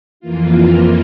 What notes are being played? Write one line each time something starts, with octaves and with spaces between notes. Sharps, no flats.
F2 E3 A#3 F4